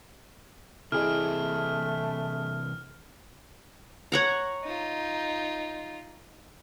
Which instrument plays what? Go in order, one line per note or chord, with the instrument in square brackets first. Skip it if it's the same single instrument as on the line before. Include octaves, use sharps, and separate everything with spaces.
[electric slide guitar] C3 E3 C4 [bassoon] A3 [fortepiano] E4 G#4 D#5 [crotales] F6
[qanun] C#5 F#5 A#5
[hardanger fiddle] D#4 F4